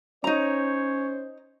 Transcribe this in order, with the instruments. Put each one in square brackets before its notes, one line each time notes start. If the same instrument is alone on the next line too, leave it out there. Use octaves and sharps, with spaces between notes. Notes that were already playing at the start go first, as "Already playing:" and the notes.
[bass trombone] C#4 [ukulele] D#4 A#5 [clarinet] C5 [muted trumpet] C#5